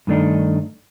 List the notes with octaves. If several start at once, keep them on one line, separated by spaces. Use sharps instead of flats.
G2 D#3 A3 D4 D#4